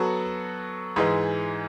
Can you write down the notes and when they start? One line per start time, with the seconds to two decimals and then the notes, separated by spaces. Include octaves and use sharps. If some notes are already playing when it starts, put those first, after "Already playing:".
Already playing: F#3 B3 F#4 A4
0.96 G#2 E3 G#3